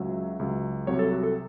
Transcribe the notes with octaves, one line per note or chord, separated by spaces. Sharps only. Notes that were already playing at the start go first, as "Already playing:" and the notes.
Already playing: C#2 C#3 F#3 E5
C#2 C#3 F#3
C2 C3 F#3 C#5
A4
F#4
A4